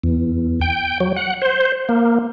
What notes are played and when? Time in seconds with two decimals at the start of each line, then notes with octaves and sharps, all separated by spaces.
0.03 E2
0.61 G5
1.00 F#3
1.16 F#5
1.42 C5
1.89 A#3